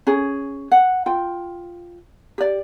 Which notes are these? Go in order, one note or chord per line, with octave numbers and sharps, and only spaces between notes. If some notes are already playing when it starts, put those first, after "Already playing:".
C#4 G#4
F#5
F4 G5
G4 D5